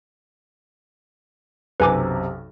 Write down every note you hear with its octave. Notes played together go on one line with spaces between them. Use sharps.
B1 F#2 C3 B4 G#5 D6